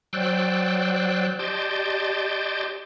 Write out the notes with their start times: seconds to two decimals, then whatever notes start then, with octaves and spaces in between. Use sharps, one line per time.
0.13 F#3 C5 D5 G5 E6 F#6
1.39 G4 D5 D#5 A5 C6 G6